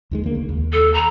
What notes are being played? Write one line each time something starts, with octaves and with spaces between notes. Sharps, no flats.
D#2 D#3 G#3
D2 A#3
C#2
D#2
A4
A#5